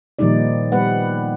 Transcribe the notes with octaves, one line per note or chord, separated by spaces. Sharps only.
A#2 D#3 F3 G3 D#4 D5
G3 B3 B4 F#5